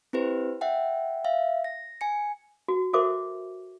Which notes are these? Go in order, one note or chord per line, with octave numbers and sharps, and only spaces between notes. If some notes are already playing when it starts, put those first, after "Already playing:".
C4 E4 G4 B4 C5
E5 F#5 G5
E5 F5
A#6
G#5 C#7
F#4
F#4 A4 A#4 C5 E5 D6